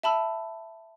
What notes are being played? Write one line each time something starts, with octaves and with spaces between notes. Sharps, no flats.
E5 A5 B5 E6